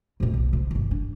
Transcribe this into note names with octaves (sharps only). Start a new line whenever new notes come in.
F2 A2
B1 B3
A2 C3
G1 E2
D4